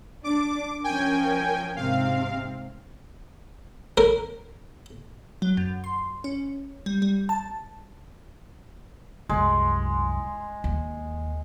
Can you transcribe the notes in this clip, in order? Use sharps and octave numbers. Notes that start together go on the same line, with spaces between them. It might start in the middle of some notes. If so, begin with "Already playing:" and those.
D4 D6
F3 C#4 A#4 G5 G#5
G#2 C3 C4 F5
A#4
F#3
F#2
C6
C#4
G3
G3
A5
C2 F#2 G#3
D#2